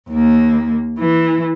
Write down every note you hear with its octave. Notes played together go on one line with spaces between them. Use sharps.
D#2 A#3
E3